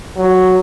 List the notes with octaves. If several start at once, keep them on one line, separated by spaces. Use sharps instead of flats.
F#3